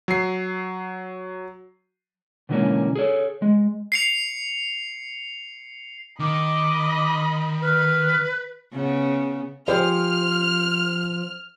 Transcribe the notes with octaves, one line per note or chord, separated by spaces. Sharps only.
F#3 C7
B2 D3 E3 G#3 A#3 C#4
G#4 A4 C#5
G#3
C7 C#7 F7
D#3 D#5 B5 D6
B4 F6
C#3 B3
F3 G4 G#4 C5 F6